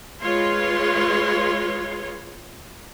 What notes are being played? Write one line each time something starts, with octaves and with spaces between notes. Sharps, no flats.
G#3 F4 B4 C#5 C6